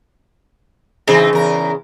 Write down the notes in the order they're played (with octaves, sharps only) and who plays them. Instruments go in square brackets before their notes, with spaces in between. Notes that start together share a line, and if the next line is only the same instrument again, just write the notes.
[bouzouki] C#3 [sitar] E3 C4 D#4
[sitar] E2 A#4